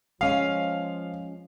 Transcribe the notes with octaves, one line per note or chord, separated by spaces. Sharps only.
F3 G#3 C#4 F5